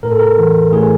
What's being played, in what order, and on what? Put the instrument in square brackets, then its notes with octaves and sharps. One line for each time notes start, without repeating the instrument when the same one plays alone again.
[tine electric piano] A2 A#4
A4
A#4
E3
A2 G#4